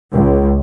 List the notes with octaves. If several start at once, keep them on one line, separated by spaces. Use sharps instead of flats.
C#2